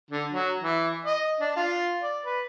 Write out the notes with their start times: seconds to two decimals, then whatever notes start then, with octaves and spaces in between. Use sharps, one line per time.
0.11 D3
0.32 F#3
0.62 E3
1.05 D#5
1.40 D4
1.57 F4
2.02 D5
2.26 B4